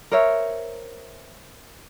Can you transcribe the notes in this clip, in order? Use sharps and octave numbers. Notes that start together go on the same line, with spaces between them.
A#4 C5 C#5 E5